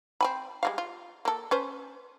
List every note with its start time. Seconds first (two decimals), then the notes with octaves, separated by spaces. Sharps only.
0.21 C4 G#5 B5
0.63 G3 G#3 F5
0.78 F4
1.25 A#3 A4
1.51 C#4 B4 C5